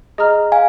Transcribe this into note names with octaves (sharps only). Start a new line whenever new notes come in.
G#4 D#5 A#5 F6
F5 G#5